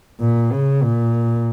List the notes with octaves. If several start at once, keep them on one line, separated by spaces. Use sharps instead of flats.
A#2
C#3
A#2